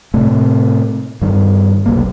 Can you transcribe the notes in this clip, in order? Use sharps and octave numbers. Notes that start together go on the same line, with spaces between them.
A2 C3 A3
G2 D#3
F1 B1 A#3